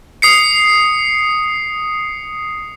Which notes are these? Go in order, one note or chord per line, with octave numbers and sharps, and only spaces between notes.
D#6 C7 C#7